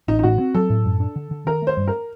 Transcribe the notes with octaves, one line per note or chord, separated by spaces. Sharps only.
A1 D#4
D#4
A2 F#4
C4
F#3 A4
A2
F#2
D4
D3
D3
D#3 A#4
A3 C5
G2
A#4